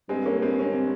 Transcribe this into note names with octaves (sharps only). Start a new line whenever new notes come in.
G2 G#3 C4
A#3 C#4
G#3 C4
C#4
C4